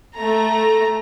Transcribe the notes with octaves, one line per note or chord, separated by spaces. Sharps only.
A3 A#5